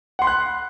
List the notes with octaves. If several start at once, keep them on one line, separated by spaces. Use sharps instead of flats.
F#5 B5 C6 F#6